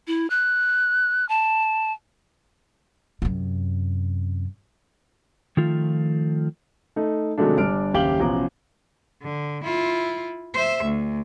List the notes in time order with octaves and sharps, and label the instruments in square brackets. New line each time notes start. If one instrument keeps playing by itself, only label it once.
[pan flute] E4
F#6
A5
[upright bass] F#2 C3
[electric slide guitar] D#3 F3 A3 F4
[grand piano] A3 D#4
C3 D#3 F#3 G#3 A3 D4
G1 G3 D4 F6 D7
F#1 D#2 G4 F5 F#7 G7
A1 B2 F3 A#5 D6
[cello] D3
E4 F4
C5 E5
D2